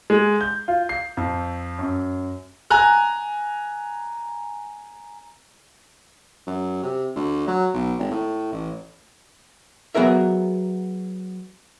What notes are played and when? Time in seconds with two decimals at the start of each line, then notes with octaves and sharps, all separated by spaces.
0.10 G#3
0.41 G6
0.68 F4
0.89 C7
1.17 F2
1.79 F#2
2.70 G#5 A#5 F#6
6.47 F#2
6.83 C3
7.16 D2
7.47 F#3
7.74 B1
7.99 G#1
8.11 A2
8.52 A1
9.95 F#3 B3 F#4 G#4 A#4 E5